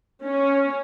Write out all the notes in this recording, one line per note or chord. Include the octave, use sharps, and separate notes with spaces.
C#4